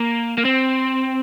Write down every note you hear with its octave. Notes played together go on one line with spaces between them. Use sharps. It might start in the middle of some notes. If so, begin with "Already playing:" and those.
Already playing: A#3
A#3
C4